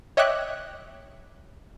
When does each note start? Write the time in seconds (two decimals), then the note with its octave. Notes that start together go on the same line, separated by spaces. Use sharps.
0.17 C#5 D#5 E5 G5 D6 F#6